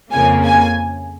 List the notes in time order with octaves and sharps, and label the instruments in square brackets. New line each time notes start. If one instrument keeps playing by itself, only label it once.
[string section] F2 C#3 A#3 G#5
G#5